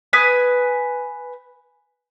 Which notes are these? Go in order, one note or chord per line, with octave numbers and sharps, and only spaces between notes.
B4 G#5 D#6